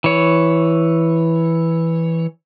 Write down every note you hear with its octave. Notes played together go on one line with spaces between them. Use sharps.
E3 C#5